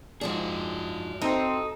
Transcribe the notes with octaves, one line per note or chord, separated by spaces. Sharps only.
G#2 F3 D4 F#4 G#4
C4 D#4 A4